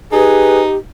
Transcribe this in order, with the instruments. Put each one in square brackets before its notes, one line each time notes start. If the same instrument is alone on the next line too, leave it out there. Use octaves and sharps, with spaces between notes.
[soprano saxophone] D#4 [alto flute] G4 [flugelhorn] G#4 [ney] B4